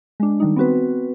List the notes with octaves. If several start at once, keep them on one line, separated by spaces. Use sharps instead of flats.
G#3 D4
D#3 G3 D#4
B3 C4 F#4 B4